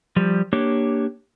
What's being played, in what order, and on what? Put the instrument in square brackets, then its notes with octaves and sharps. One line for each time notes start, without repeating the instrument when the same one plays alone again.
[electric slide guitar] F3 G3
A#3 D4 G4 C#5